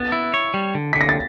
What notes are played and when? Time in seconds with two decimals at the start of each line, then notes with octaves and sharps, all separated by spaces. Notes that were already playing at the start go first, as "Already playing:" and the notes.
Already playing: B3 A6
0.12 E4
0.34 C#5
0.54 G3
0.75 D3
0.93 D3 B6
1.01 A#6
1.09 A6